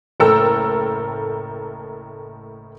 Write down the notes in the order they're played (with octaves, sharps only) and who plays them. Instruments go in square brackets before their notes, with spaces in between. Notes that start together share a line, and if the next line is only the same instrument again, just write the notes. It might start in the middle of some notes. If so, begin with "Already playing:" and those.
[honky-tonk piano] F#1 A2 A4 A#4 G5 E6